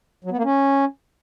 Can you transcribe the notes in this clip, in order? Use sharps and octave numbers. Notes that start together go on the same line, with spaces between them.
F#3
B3
A#3
C#4